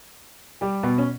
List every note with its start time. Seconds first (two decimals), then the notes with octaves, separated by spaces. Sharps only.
0.61 G3 G4
0.83 B2 B3
0.98 C#4